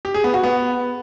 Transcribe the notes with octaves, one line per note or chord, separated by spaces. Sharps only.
G4
G#4
B3
F#4
B3